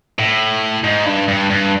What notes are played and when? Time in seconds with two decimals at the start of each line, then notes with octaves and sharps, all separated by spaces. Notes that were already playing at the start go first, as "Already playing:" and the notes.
0.19 A2
0.84 G#2
1.06 G2
1.28 G2
1.50 G2